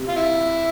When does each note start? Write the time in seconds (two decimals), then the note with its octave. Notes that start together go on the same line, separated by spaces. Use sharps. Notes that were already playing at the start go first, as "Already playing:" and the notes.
Already playing: C3
0.08 F4
0.16 E4